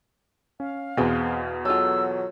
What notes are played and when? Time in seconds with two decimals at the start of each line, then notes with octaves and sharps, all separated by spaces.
0.60 C#4 F5
0.97 E2 B2 B3 C4 G#4
1.65 F#3 F4 G#4 A4 E6